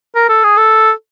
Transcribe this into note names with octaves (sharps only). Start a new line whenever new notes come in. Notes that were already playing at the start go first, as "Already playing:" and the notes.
A#4
A4
G#4
A4